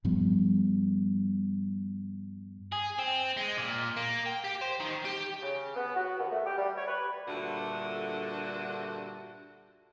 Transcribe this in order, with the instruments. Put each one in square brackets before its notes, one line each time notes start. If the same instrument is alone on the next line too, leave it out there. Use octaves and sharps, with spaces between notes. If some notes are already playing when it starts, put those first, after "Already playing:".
[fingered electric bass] G2 F3 G3 B3
[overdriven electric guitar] G#4
C4
G#3
A#2
A#3
G5
G4
C5
D#3
G4
[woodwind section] C#3
B3
F#4
D#2
A3
G4
G3
C#5
B4
[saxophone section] G2 A#2 D3 A3 D4 F#4